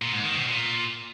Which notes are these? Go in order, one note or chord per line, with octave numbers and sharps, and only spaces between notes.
A#2
G#2
D#3
B2
A#2